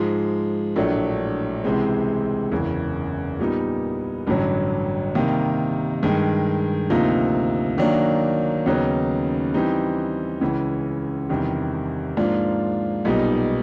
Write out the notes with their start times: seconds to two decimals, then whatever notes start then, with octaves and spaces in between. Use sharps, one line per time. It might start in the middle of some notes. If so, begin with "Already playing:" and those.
Already playing: G#2 F3 G#3
0.76 A#1 A2 F#3 A3 D4
1.64 C#2 C3 E3 G#3 C4
2.52 F#1 E2 C#3
3.39 A#2 G3 B3 D#4
4.27 A1 G2 D3 F#3
5.15 C3 D#3 G3 A#3
6.03 G2 D#3 G#3
6.90 D2 C3 F3 A#3 D#4
7.78 D#3 F#3 A#3 D4
8.66 D#2 C#3 F#3 B3 D#4
9.54 E3 G3 C4 D#4 G4
10.41 C#2 C#3 E3
11.29 E2 C3 D#3 G3
12.17 G#2 F3 A#3 D4 F4
13.05 B1 A#2 G3 B3 D#4